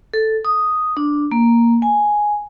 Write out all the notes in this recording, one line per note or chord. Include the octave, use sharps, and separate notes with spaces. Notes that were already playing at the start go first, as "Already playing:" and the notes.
A4
D#6
D4
A#3
G#5